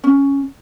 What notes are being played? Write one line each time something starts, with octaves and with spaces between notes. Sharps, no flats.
C#4